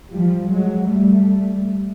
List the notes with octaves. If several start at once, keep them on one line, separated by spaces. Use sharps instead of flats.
F3 G3
F#3 G#3
G3 A3